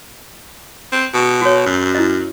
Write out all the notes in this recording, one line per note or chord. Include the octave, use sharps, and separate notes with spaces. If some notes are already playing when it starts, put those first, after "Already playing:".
C4
B2
F#4 C#5
F#2
E4 D#5